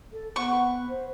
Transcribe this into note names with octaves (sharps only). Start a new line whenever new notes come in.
A4
B3 C4 C5 F#5 C#6
B4
C5